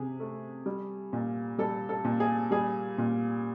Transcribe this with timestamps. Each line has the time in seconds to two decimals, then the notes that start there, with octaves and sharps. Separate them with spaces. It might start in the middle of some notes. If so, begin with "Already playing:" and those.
Already playing: C3 G4 G#4
0.20 A3
0.66 G3
1.13 A#2
1.58 G3 A4
1.89 A4
2.04 A#2
2.20 G#4
2.51 G3 G#4
2.98 A#2